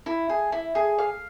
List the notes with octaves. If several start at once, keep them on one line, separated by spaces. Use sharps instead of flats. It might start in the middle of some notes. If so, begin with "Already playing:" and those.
E4
G#4
E4
G#4
F5